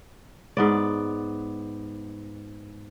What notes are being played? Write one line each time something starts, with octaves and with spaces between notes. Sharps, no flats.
G#2 B3 D5